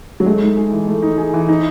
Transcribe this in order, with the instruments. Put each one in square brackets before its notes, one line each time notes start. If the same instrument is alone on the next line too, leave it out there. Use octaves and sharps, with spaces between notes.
[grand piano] F#3
[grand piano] G#3 [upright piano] A3
[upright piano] D#4
G#4
E3
A3
D#4
G#4
E3
[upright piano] D#4 [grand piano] E4